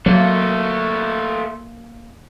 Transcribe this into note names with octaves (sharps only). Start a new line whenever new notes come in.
F#3 A3 A#3 F4